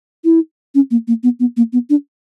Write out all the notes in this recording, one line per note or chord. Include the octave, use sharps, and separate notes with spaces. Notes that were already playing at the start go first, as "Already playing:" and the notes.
E4
C#4
A#3
A#3
B3
B3
A#3
B3
D4